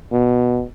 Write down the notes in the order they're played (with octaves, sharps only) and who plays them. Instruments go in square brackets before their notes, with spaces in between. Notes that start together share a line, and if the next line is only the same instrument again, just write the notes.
[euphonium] B2